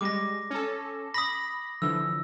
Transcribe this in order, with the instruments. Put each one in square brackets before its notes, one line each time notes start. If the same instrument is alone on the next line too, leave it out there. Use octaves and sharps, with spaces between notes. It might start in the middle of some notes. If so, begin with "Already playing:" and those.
[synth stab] G3 G#3 [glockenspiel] D6 A#6
[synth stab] C#4 A4
[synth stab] B5 [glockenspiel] D#6 A#6
[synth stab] D3 E3 F3 [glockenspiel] E6